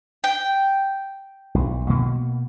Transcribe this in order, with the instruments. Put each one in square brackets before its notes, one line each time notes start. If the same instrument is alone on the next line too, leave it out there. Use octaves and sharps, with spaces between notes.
[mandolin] G5
[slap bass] B1
B2 A#3